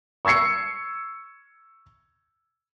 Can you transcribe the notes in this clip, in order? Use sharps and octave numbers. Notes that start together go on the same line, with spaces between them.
C#6 E6 G#6 C7 C#7